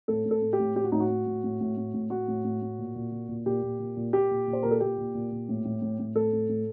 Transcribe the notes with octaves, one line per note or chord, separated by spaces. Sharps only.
A2 A4
A2
A4
A2
G4
A2
A2 G4
F#4
A2 D#4
F#4
A2
A2
A2
A2
A2
A2
A2 F#4
A2
A2
A2
A#2
A#2
A#2
A#2
A#2 G4
A#2
A#2
A#2
A#2 G4
A#2
A#2
C5
A#2 A#4
A4
A#2 G4
A#2
A#2
A#2
A2
A2
A2
A2
A2 A4
A2
A2